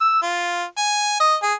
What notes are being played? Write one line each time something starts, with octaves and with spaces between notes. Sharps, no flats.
E6
F4
G#5
D#5
G#4